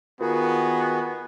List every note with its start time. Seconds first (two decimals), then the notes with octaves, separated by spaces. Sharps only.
0.21 D#3 B3 F4 F#4 G#4 A#4